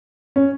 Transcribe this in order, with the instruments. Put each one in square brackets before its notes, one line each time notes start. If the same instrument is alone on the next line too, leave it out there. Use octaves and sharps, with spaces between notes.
[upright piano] C#4